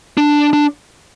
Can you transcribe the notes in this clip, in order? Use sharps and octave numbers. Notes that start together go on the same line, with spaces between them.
D4
D4